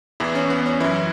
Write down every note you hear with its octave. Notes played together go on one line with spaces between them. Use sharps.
E2 E3 E4
C#4
B3
C#4
F#2 E3 E4